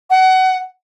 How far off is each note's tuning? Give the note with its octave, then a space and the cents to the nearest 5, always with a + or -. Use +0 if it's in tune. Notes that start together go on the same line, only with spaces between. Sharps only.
F#5 +25